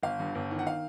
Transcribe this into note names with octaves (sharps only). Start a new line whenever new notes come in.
G1 F5
G2
G1
D#3
F#5
F5